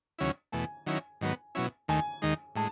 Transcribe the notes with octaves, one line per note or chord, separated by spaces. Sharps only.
D#2 C#3 F#3 C#4 E4
E2 B2 A3 G#5
D#3 F#3 C#4 E4
G#2 D#3 F#3 B3
B2 F#3 C#4 E4
D#2 D#3 A3 G#5
D#2 D#3 G#3 D#4
A2 G#3 A5